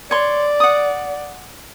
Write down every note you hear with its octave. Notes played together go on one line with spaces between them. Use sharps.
C#5 D5 C6
F#5 D#6